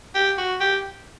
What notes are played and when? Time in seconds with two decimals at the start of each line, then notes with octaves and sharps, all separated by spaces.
0.15 G4
0.38 F#4
0.60 G4